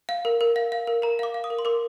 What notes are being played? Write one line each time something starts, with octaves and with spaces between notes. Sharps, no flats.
F5
A#4
A#4
F5
F5
A#4
A#4 A#5
F5 D6
F5
D#6
A#4
C6
A#4 D6